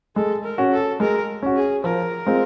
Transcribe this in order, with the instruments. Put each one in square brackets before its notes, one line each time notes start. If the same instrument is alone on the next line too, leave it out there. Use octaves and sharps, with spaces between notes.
[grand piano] G#3 [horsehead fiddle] A4
[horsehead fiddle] A#4
[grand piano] C#4 F#4
[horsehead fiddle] A4
[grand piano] G#3 [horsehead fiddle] A#4
[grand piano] C#4 F#4
[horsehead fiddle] G#4
[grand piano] F3 [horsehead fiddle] A#4
[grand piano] G#3 C4 F4